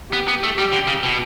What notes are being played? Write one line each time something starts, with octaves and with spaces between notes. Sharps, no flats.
B3 G4
B3
A3
G3 G4
D3
C#3
B2